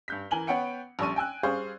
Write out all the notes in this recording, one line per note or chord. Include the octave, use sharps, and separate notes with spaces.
G2 G6 B6
E3 A#4 G#5 F#7 G7
B3 C#5 F#5 G5 C#7
A#1 G3 A4 C#6 D#7
G5 G#5 E6 F#6
G3 G#4 C5 F5 C#6 G6